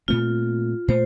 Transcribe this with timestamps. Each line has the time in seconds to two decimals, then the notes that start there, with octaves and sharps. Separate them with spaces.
0.08 A#2 A3 C4 F4
0.88 A#2 A3 C5